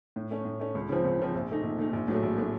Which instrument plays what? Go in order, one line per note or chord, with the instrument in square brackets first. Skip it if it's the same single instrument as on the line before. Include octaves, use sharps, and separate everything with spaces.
[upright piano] A2
A3 C#4
A2
A3 C#4
C#2
C#3 F3 C4
C#2
C#3 F3 C4
A#1
A#2 A3 D#4
A#1
A#2 A3 D#4
A#1
A2 F#3 A3
A#1
A2 F#3 A3